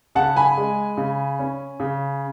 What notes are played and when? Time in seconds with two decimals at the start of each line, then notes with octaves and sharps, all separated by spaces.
0.15 C#3 F#5 A5
0.36 G#5 B5
0.57 G#3
0.97 C#3
1.39 C#4
1.80 C#3